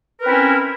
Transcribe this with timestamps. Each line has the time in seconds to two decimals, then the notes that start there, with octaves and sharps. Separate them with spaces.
0.18 A#4
0.21 B4
0.25 C4
0.28 E4
0.32 C#4